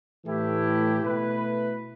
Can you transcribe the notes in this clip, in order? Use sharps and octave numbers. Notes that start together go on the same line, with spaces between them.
A2 E3 A3 E4 G4
B2 A3 E4 B4